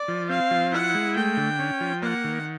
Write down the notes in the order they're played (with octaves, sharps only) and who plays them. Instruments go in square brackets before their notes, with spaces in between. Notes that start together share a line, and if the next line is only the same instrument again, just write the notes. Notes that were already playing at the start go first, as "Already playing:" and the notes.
Already playing: [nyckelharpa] D5
[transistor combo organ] F3
[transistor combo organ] C4 [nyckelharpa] F5
[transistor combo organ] F3
[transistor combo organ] E4 [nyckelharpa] F#5
[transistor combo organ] G#3
[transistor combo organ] A3 [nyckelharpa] G5
[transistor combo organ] D3
C#4
F3
[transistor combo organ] A#3 [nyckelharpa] F#5
[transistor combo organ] D#3